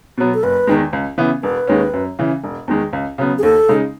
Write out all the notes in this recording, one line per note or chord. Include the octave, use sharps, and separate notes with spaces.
B2 F#3 B3
A4
F#1 B4
E2 D#3 G#3
C#2
C#3 E3 B3
E1 B4
D#2 D#3 G#3 C#4
F#2
C#3 E3
E1
E2 D#3 G#3
C#2
C#3 F#3 B3
G#4
D#2 A4
C#3 G#3 D#4